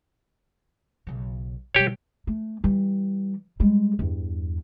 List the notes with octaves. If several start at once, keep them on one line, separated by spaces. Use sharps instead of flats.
B1 C#3
B2 G3 G4 C#5
A3
E3 G3
G3 G#3
E2 G2